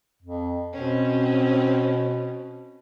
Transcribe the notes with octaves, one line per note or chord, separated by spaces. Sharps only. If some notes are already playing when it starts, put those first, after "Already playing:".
F2
B2 C4 C#4